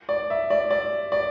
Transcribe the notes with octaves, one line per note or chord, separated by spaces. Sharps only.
D5
E5
D5
D5
D5